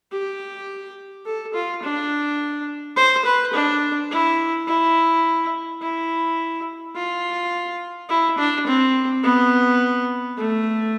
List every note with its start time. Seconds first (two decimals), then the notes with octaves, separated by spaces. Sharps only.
0.12 G4
1.26 A4
1.54 F4
1.83 D4
2.96 C5
3.25 B4
3.53 D4
4.11 E4
4.67 E4
5.82 E4
6.95 F4
8.09 E4
8.38 D4
8.66 C4
9.23 B3
10.37 A3